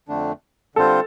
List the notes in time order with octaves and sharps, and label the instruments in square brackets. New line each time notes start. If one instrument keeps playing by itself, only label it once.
[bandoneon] F2 D3 A3 D4
[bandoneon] D3 G3 C4 F4 C5 [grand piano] A4